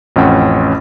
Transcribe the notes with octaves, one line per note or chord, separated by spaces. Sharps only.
A1 F2 C#4 C#5 F#5 G5